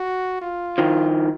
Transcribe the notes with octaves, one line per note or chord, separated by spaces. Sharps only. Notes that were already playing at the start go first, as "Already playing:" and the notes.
Already playing: F#4
F4
D#3 F3